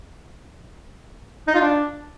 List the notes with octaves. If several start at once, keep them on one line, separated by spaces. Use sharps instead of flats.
D#4
F4
D4